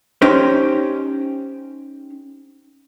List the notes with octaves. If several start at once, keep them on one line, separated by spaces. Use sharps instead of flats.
C#4 D#4 G4 C5